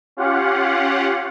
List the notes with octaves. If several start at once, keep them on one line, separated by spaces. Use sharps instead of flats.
C#4 F4 G4 F5 F#5